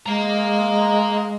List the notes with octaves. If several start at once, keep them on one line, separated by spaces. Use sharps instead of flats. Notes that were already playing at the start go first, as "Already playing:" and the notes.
G#3 F5 A#5